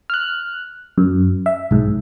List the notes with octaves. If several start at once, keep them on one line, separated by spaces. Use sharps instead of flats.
F6 F#6
F#2
E5
B1 G#2